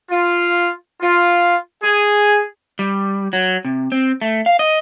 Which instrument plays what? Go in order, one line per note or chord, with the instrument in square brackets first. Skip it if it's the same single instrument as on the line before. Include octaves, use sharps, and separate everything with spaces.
[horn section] F4
F4
G#4
[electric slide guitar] G3
F#3
C3
C4
A3
F5
D#5